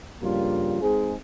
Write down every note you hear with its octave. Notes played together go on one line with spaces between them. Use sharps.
G2 C#3 F3 G3 A#3 F4
G#3 C4 D#4 G#4